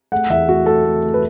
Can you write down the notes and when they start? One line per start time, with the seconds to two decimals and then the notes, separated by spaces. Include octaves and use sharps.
0.12 A3 F#5
0.30 E2 E5
0.48 A3 F#4
0.66 A3 A4
0.84 A3
1.03 A3
1.14 B4